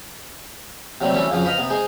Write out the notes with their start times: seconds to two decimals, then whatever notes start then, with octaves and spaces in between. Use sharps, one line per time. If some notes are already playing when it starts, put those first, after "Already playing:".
1.01 C3 F#3 G3 A3 C4
1.13 E3 G3 A3 C#4 F#4 A4
1.30 F2 C#3 F3 F#3
1.45 B4 C5 D#5 F5 F#5 A#5
1.58 C3 B3
1.70 G#3 D#4 G#4 C5